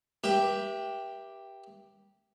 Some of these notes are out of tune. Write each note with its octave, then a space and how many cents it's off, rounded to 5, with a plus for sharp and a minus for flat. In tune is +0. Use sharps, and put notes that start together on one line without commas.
G4 +0 B4 -45 E5 +10